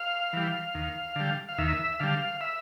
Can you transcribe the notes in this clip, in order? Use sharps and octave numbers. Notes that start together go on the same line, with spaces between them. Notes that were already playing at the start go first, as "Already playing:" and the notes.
Already playing: F5
E3 G3
D#2
D3 G3
F5
D#2 E5
D3 G3 F5
E5